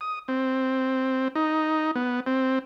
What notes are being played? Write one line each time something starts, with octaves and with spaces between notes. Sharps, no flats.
D#6
C4
D#4
B3
C4